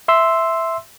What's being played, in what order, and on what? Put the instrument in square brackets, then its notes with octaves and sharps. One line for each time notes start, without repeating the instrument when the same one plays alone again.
[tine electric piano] E5 C6 E6